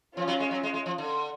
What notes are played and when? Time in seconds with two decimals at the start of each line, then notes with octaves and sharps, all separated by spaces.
0.16 F3 C#4 F4
0.28 F#3
0.40 G#3
0.51 F#3
0.63 G#3
0.74 G#3
0.86 F3
0.98 D3